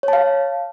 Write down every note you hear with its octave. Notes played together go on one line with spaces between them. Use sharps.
C#5
A5
F5